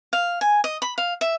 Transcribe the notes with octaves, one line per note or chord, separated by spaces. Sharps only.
F5
G#5
D#5
B5
F5
E5